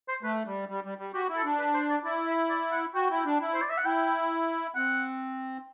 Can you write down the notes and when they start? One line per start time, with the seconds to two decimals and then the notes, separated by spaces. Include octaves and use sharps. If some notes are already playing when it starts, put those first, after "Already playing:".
0.08 C5
0.23 A3 B4
0.46 G3
0.69 G3
0.84 G3
0.98 G3
1.14 F#4 G4
1.29 E4
1.37 A4
1.44 D4
1.59 B4
1.74 C5
1.90 D5
2.04 E4 D5
2.27 E5
2.50 D5
2.72 F#5
2.95 F#4 G5
3.10 E4
3.25 D4
3.40 E4
3.54 C5
3.62 D5
3.70 E5
3.78 F#5
3.85 E4 G5
4.75 C4 F#5